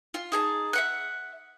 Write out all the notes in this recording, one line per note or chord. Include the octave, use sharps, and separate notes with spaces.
F4
D#4 G#4 A5
E5 F#5 F#6